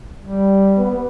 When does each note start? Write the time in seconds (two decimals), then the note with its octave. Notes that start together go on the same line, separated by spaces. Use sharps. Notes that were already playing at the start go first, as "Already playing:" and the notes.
0.22 G3
0.77 B3